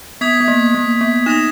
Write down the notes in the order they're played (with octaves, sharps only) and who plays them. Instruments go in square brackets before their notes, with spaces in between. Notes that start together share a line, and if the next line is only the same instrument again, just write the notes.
[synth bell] B3 [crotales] D#6 G#6 B6
[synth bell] B3
A#3
A#3
B3
[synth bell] D#4 [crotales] D#6 A#6 E7